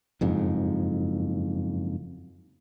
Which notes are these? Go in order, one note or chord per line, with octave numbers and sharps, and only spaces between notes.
F#1 F2 G#2